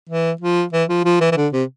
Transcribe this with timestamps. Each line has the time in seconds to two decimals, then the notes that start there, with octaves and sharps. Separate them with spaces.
0.09 E3
0.41 F3
0.73 E3
0.89 F3
1.05 F3
1.21 E3
1.32 E3
1.37 D3
1.53 C3